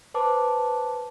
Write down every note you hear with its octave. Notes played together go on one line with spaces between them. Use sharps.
B4 C5 A5 D6